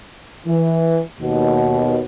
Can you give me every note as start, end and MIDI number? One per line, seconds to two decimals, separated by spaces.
0.47 1.00 52
1.20 2.01 39
1.20 2.01 47